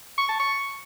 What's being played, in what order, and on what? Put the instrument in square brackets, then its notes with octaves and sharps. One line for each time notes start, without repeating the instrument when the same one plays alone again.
[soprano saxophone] C#6
A5
C#6